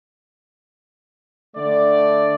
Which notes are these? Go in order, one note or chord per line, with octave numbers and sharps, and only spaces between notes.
D3 A3 D5